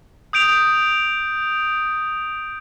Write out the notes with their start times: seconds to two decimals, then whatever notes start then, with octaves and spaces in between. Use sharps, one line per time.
0.33 D#6 G6 D7 F7